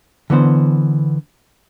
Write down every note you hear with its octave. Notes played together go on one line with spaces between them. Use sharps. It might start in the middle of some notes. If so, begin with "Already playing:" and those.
D3 E3 B3 C5